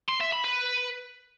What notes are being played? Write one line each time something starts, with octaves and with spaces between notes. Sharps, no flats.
C6
E5
B5
B4